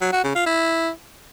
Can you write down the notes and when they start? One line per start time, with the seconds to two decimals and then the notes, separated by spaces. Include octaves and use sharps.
0.01 F#3
0.13 F#4
0.24 C#3
0.35 F4
0.46 E4